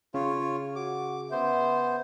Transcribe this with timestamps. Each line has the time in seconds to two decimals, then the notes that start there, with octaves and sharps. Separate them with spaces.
0.14 C#3 F4 C#5
0.76 F#4 D6
1.31 B3 C5 E5